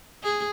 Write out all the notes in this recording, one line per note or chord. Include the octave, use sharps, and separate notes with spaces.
G#4